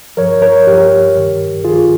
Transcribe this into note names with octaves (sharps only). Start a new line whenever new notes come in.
G2 F3 A#4 C#5
A#4 C#5
G2 F3 G4 A#4
G2 D#3
G2 D#3 F4 G#4